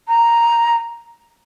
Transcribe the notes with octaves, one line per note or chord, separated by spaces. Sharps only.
A#5